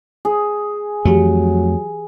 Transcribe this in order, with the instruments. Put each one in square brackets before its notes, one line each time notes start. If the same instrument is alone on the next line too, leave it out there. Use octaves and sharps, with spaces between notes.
[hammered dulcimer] G#4
[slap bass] F2 A3 [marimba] E3 G4 [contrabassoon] F#3